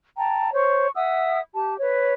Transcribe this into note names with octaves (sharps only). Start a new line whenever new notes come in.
G5 A5 A#5
C5 C#5 C#6
E5 F#5 D#6 E6
G4 A5
B4 C#5